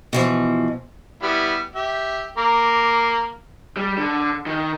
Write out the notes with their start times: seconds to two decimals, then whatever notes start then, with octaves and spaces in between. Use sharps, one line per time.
0.13 B2 E3 F3
1.23 G3 B3 E4
1.76 G4 E5
2.38 A#3 A#5 D6
3.77 G3
3.98 D3
4.46 D#3